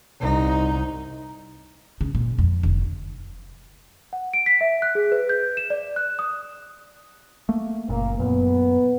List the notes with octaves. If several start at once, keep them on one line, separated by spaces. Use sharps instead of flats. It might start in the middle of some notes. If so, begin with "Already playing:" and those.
C2 D#4
C#3
A#2
F2
F1 D3
F#5
D7
B6
E5
F#6
G#4
B4
G6
E7
D5
F#6
D#6
A3 A#3
F#1 A#2 A#3
F#2 A#2 B3